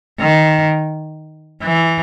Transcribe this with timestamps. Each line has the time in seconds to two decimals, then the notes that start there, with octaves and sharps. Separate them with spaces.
0.20 D#3
1.63 E3